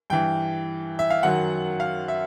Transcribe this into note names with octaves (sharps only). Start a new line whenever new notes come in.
G2 E3 G5
E5
F5
F#2 D#3 F#3 F#5
F5
E5